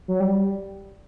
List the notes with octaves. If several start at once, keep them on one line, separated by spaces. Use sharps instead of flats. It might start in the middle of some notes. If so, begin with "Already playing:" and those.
F#3
G3